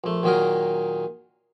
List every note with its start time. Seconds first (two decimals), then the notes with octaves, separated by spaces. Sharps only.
0.04 A#1 A3
0.23 A#2 D#3 F#3 D#4 G#4 A#4